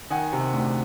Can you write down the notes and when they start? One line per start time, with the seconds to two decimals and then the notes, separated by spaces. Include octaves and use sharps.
0.10 D#3 F#5 G#5
0.33 C3
0.53 D2